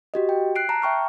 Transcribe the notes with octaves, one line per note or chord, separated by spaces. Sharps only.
F#4 G4 D#5
G5
F#6 C7 D7
A5 A#5
E5 G5 C#6 F6